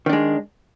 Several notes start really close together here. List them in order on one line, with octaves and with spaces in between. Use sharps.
D#3 D4 G#3